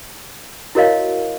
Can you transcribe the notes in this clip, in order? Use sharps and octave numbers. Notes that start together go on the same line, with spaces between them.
E4 F#4 A#4 C#5 D#5 F5